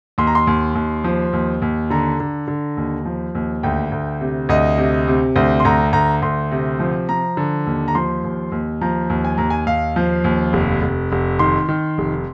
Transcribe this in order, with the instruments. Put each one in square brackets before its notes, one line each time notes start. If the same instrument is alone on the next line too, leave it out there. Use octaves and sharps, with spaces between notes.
[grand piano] D#2 C6
A#5
C6
D#2
D#2
F3
D#2
D#2
D3 A#5
D3
D3
D#2
F3
D#2
D2 G5
D2
C3
D2 D#5
C3
C3
D2 C5
C6
D2 A#5
D2 A#5
D2 C6
C3
F3
F3 A#5
D3
D#2
A#5
F3 C6
D#2
D#2
F3 A#5
D#2
G#5
D#2 A#5
G#5
D#2 F5
F3
D#2
F1
F1
F1
D#3 C6
D#3
F1